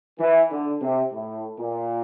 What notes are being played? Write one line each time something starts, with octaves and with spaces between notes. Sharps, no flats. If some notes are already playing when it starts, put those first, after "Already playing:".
E3
D3
C3
A2
A#2